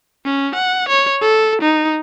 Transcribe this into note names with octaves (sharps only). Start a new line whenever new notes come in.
C#4
F#5
C#5
A4
D#4